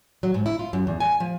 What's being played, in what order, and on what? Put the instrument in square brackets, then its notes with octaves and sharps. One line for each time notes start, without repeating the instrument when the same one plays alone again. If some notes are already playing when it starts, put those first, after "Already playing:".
[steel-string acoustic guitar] F#3
G#2
E4
F4
F#2
E2
G#5
F3